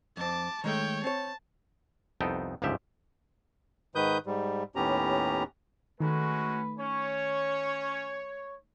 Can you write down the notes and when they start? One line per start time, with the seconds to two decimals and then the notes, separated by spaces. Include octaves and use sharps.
0.17 F2 C4 A5 D6
0.64 D#3 G#3 A3 C#5 G5
1.04 C4 C#5 A5
2.21 C2 F2 B3 D#4 A4 G5
2.62 G1 C#2 G#2 F3 G4 E5
3.95 G#2 D#3 B4 D#6 G6
4.26 G#2 G3
4.76 D#2 A2 B3 C#4 G4 A#5
6.00 D#3 G#3 A3 C#4 F#4 B4
6.79 C#4 C#5